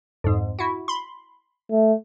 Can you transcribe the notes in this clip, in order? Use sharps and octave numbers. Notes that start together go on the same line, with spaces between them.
F2 G#2
E4 F#4
B5 C6
A3